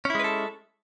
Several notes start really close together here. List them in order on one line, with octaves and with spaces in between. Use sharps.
C#4 E4 G#3 B4 A4